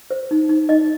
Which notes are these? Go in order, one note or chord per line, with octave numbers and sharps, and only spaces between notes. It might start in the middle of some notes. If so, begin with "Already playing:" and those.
C5
D#4
D#4
D#4 D#5